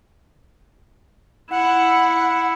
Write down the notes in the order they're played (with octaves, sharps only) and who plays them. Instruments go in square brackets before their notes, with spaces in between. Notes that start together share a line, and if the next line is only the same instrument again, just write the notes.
[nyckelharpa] E4 [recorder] F#5